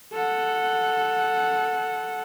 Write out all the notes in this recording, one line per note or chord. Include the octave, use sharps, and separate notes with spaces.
A4 F#5